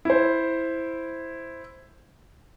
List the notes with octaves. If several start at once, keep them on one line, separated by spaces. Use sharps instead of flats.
E4 C5